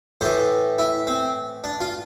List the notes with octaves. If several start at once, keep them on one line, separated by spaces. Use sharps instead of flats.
A2 E3 C5
E4
C4
D4
F4